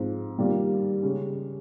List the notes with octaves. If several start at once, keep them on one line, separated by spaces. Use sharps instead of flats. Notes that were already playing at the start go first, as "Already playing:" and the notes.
Already playing: G#2 F3 C4
D#3 G3 A#3 F4
C#3 G#3 C#4